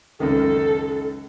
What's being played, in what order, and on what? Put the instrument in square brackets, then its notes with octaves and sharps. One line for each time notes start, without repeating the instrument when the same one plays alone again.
[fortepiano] C#2 F#2 D#3 [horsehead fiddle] A4